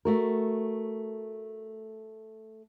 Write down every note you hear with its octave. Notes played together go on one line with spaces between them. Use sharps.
A3 F#4 A#4